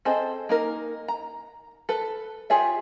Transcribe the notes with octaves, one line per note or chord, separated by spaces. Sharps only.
C4 G#4 A4 C5 D#5
A#3 D#4 A#4
A#5
A4 B4
F4 G4 G#4 C#5 E5